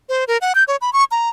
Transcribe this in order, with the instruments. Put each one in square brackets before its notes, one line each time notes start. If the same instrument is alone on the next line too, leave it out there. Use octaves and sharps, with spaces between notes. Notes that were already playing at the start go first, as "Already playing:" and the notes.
[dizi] C5
A#4
F#5
G6
C#5
B5
C#6
A#5